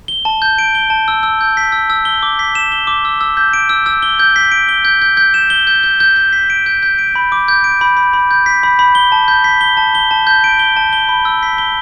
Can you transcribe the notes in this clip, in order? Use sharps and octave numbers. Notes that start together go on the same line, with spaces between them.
G7
A5
G6
D7
G7
A5
E6
E6
G6
B6
E6
E6
G7
D6
B6
E7
G7
D6
E6
E6
G6
D7
E6
E6
G7
G6
B6
D7
G7
G6
G6
G6
E7
G7
G6
G6
G6
G6
B6
D7
G6
G6
D7
B5
D6
G6
D7
B5
B5
B5
G6
B6
B5
B5
G7
A5
G6
B6
G7
A5
G7
A5
G6
D7
G7
A5
G7
B5
E6
B6
G7